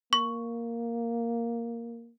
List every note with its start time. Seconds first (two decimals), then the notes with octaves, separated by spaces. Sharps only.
0.13 A#3 C#6